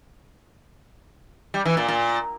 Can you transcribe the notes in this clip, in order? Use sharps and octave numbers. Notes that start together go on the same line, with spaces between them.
G3
E3
A#2
A#2